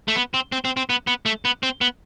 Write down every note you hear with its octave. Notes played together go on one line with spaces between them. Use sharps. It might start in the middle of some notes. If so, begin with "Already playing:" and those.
A3
B3
C4
C4
C4
C4
B3
B3
A3
B3
C4
B3